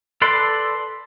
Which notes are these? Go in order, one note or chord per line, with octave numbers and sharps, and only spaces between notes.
A4 B4 D5 B5 C6